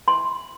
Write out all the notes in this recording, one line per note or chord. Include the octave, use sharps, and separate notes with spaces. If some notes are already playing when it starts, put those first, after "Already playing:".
C6